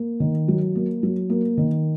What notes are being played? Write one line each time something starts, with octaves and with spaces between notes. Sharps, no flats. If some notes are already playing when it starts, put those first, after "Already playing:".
Already playing: A#3
D#3
F#3
A#3
F#3
A#3
D#3